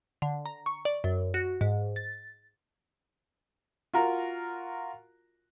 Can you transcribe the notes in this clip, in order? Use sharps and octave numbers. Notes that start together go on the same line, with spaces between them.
D3
A#5
C#6
D5
F#2
F#4
G#2
A6
F4 F#4 A#4 A#5